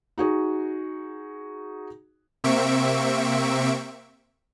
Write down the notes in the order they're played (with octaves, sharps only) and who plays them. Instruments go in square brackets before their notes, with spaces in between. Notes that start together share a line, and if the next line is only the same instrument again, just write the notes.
[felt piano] D#4 F#4 G#4
[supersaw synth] C3 A#3 C4 E5 C#6 D7